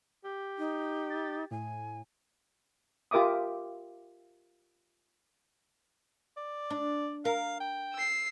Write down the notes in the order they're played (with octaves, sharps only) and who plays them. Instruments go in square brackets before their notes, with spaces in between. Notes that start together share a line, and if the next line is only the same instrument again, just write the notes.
[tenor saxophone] G4
[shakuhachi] D#4
[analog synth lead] A6
[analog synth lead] A2 [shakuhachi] G#5
[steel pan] F4 G4 A#4 E5 D6 D#6
[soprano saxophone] D5
[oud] D4
[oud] A#4 [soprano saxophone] F5
[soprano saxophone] G5
[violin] E6 C7